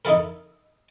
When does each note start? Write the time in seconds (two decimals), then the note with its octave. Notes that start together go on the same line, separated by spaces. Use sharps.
0.05 D#4 E4 A4 A#4